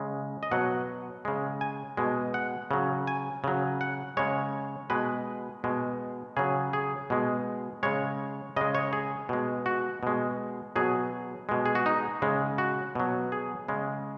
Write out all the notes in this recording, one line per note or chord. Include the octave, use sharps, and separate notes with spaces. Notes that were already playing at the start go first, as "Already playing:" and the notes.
Already playing: C#3 G#3
D#5
B2 F#3 F#5
C#3 G#3
G#5
B2 G#3
F#5
C#3 F#3
G#5
C#3 F#3
F#5
C#3 G#3 C#5
B2 G#3 B4
B2 G#3
C#3 F#3 G#4
G#4
B2 G#3
C#3 G#3 C#5
C#3 G#3 D#5
C#5
G#4
B2 G#3
F#4
B2 G#3
B2 F#3 G#4
B2 G#3
G#4
F#4
D#4
C#3 G#3
F#4
B2 F#3
G#4
C#3 G#3